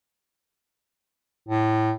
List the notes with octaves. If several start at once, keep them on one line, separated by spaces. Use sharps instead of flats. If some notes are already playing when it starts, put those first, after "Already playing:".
A2